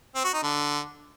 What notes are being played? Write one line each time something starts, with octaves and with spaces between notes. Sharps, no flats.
C4
F#4
D#4
D3